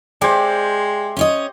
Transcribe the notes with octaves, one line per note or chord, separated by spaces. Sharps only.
G#3 G4 C5 D5 E5
C#4 C#5 D#5